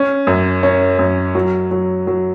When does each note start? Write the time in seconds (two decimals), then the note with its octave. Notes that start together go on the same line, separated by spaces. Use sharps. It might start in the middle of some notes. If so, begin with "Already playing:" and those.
Already playing: C#4
0.27 F#2
0.63 C#4
0.99 F#2
1.35 F#3
1.71 F#3
2.07 F#3